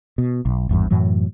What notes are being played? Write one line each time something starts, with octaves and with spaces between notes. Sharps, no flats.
B2
B1
G#1 E2 G2
F#2 A2 E3 F#3